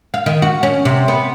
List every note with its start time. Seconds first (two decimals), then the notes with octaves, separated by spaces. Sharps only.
0.14 F5
0.26 D#3
0.42 F#4
0.63 C#4
0.85 C3
1.08 B3